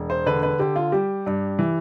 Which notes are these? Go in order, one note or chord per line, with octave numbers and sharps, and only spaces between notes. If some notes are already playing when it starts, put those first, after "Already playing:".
Already playing: E1
C5
D3 B4
B4
D3 G4
F4
G3 G4
G2
E3